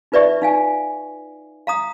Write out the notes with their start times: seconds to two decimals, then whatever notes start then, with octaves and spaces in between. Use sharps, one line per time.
0.12 D#4 F4 B4 D5 E5 C#6
0.42 D#4 F5 G#5
1.67 F5 A#5 D#6